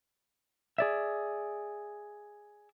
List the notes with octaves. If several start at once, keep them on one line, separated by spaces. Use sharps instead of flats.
G#4 D5 E5